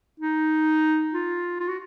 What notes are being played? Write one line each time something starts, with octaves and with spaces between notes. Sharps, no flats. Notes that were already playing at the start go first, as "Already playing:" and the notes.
D#4
F4
F4
F#4